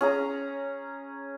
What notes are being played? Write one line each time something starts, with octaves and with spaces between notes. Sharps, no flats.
C#4 G#4 A#5